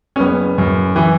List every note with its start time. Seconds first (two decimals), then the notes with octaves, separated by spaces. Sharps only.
0.16 C#4
0.20 F#1 B3
0.58 F#2
0.96 E3